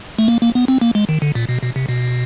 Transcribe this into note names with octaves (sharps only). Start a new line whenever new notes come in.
A3
A#3
A#3
B3
C4
A#3
G#3
D#3
D3
A#2
B2
B2
C3
B2